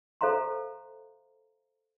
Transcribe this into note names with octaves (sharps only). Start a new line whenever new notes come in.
A4 C5 E5 F5 A#5 C6